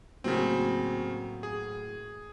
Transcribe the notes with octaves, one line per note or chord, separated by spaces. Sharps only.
A2 C#3 F#3 A#3 C4
G#4